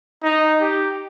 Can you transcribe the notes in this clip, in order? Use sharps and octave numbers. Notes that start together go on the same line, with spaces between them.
D#4
G4